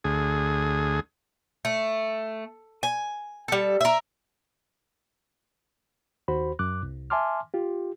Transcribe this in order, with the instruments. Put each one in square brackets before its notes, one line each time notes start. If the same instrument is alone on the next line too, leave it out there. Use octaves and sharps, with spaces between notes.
[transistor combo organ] D2 G#4
[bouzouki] A3
G#5
G3 A4
A#4 E5
[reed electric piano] D#2 F#4 C5 B5
F#2 D6 F#6
C2
E5 G#5 A5 C6 D6 F6
F4 G4